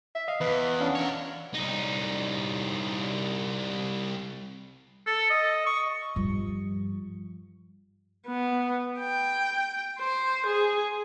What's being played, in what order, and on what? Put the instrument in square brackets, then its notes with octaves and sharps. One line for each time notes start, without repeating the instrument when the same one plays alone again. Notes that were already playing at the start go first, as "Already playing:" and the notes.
[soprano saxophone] E5
[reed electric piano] D#5 [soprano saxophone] F5
[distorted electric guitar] E2 [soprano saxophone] B4
[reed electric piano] C#4 F5 F#5 [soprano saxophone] D4
[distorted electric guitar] A#4 C#5
C2 D#4
[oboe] A4
D#5
C#6
[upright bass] G2 F3
[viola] B3
G5
C5
G#4